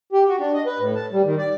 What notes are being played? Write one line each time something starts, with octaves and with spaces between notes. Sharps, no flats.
G4
F#4
D4
D#5
B4
A2
A5
G3
D#3
D5